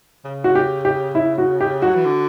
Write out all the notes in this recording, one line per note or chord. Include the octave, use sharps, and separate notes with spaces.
C#3
F#4
G4
G4
E4
F#4
G4
F#3 F#4
E3
D3